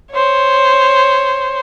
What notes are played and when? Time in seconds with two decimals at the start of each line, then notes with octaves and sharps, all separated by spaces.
0.13 C5 C#5